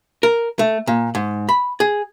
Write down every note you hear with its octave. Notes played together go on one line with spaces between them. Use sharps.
A#4
A3
A#2
G#2
B5
G#4